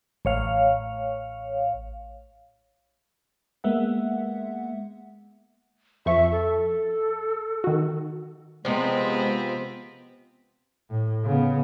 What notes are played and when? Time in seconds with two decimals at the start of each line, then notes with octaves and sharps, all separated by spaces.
0.25 A1 C#5 F5
3.64 G#3 A#3 B3 E5 F#5
6.06 F2 F3 E5 C#6
6.31 A4
7.64 D#3 F#4
8.65 C3 F3 G#3 B3 C4
10.91 A2
11.25 C#3 B3